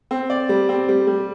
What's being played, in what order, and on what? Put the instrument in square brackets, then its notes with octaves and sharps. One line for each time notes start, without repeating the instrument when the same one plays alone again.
[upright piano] C4
D5
G3
C4
G3
G3